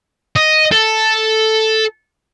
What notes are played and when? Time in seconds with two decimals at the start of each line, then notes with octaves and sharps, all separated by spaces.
0.36 D#5
0.72 A4